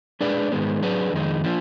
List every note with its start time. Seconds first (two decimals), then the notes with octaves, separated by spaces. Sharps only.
0.21 G#3 D4 G#4 B4 D5
0.52 G#2 D#3 G#3 B3
0.82 F#3 D4 G#4 B4
1.13 F2 D#3 G#3 D#4
1.44 F3 A#3 D4 F4